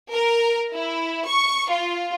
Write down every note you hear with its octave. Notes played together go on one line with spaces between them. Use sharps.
A#4
E4
C#6
F4